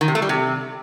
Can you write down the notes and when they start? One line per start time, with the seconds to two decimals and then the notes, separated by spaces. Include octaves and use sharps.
0.01 D#3
0.08 C3
0.15 A3
0.22 G3
0.29 C3